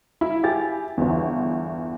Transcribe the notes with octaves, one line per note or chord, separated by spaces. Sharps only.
E4
E4 G4 G#5 A6
G1 E2